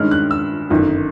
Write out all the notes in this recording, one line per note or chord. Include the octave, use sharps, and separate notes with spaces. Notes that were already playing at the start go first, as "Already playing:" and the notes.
Already playing: G2 D#3 G#3 C#4 F6
F#6
E6
G1 F#2 D#3